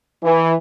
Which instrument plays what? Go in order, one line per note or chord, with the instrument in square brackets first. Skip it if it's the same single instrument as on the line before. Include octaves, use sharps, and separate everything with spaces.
[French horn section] E3